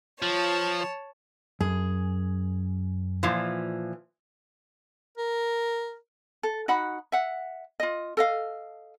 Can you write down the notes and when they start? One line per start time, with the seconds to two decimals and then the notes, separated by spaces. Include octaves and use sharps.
0.22 F3 C#5 A5
1.61 F#2 G#4
3.23 A#2 E3 F3
5.18 A#4
6.43 A4
6.68 D#4 F#4 F#5 B5
7.12 E5 F#5
7.80 F4 D#5
8.17 A4 D#5 F5